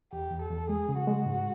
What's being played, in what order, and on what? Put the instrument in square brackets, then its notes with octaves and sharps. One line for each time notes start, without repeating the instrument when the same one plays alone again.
[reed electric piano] E2 [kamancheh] G4
[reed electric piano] E2
[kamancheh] A4
[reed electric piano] E2
[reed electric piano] G#3 [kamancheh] G#4
[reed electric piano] C#3
[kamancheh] F#4
[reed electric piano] G#3
G#2